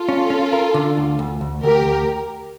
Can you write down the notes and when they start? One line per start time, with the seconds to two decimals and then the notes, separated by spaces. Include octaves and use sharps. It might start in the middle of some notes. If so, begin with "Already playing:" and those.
Already playing: F4 A4
0.09 C#4
0.30 C#4
0.53 A#4
0.74 D3
0.97 D2
1.19 D2
1.41 D2
1.63 D2 G4 A#4
1.86 D2